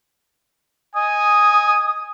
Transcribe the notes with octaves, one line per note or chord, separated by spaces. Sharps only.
D#5 G#5 D#6